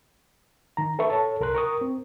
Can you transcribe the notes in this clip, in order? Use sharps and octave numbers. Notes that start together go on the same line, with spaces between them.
D#3 A#5
A4 B4 E5 C#6
A4 C#5 A5
C2 A#4 C6 F#6
A#4 C#6 D#6
C4